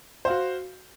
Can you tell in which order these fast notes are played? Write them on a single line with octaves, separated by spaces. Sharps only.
C5 F5 F#4